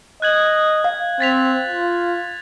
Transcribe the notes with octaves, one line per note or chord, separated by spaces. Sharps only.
D#5 F#6 G#6 F#7
F5
C4 A6 B6 F7
F4